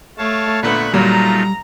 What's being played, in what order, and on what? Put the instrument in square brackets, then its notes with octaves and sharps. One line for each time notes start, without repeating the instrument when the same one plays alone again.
[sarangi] A3 [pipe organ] C#5 F5 A5
[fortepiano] A#2 A3 B3 [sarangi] D3 [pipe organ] B5 C#6 F#6
[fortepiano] A#2 F#3 [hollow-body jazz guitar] G3 [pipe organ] A3 D#4 F4 [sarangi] A#5